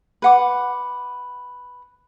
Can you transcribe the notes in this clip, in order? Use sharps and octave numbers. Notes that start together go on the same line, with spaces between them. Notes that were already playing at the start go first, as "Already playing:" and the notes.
B4 F#5 D6